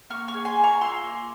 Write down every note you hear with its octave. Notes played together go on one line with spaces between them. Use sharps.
A#3 C#6 F6
C#6 F6
G#4
G#5 C6
A#3
A#5 C#6
F4 C6 E6
A#3